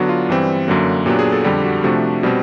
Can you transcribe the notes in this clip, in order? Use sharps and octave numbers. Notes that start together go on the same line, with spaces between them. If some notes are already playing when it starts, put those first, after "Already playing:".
Already playing: D3 F#3 B3 D4 F#4
F4
G2 E3 G3 C4
F#2 D3 F#3 A#3
A#2 F#3 B3 D4 G4
G#4
A4
F2 D3 G3 G4
F#4
C3 F3 A3 D4 F#4
B2 G3 C4